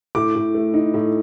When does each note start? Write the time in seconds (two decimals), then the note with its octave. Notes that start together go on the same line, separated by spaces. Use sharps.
0.15 A2 D6
0.36 A2
0.54 A3
0.74 D#4
0.94 A2